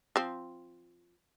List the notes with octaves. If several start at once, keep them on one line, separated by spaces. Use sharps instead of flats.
F3 C4